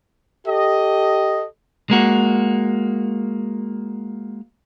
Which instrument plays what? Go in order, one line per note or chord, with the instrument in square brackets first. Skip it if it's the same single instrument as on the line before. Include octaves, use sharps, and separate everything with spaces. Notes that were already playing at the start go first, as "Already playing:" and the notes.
[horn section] G4 A4 D#5
[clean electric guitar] G#3 A#3 F#4